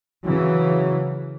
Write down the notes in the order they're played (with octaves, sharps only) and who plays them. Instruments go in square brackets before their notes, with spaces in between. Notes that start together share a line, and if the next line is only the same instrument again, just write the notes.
[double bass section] C#3 E3 [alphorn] F#3